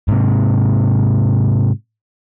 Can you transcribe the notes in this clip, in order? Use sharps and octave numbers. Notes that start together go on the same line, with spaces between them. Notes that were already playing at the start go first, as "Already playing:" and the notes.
G#2 C3